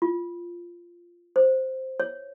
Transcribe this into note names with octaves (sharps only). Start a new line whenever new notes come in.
F4
C5
C#5